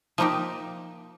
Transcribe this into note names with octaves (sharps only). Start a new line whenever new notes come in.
F3 A#3 D#4 G4